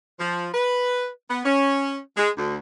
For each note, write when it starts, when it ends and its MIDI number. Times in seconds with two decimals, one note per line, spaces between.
0.19 0.48 53
0.54 1.07 71
1.29 1.42 59
1.45 1.98 61
2.17 2.30 56
2.37 2.56 38